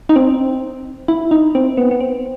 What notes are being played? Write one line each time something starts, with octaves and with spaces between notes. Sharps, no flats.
D#4
C4
E4
D#4
C4
B3
B3
C4